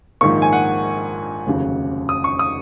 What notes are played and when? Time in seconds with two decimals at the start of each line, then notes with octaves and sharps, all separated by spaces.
0.21 A#1 G#2 D#3 A#3 C#6
0.42 G#5
0.53 F#5
1.46 F1 D#2 C#3 F#3
2.09 D#6
2.24 C#6
2.39 D#6